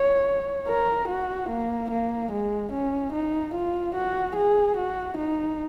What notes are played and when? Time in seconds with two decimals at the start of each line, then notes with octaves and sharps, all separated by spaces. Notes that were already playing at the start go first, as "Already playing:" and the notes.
Already playing: C#5
0.68 A#4
1.09 F#4
1.50 A#3
1.91 A#3
2.32 G#3
2.73 C#4
3.13 D#4
3.55 F4
3.95 F#4
4.36 G#4
4.77 F#4
5.18 D#4